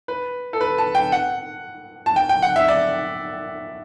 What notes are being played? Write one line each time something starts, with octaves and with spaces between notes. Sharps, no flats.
B4
A4
B4
A5
G5
F#5
A5
G5
G5
F#5
E5
D5